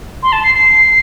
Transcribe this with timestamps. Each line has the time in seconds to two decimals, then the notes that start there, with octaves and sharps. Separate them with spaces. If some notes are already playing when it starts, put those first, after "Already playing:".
0.23 C6
0.32 A5
0.43 C7
0.55 C7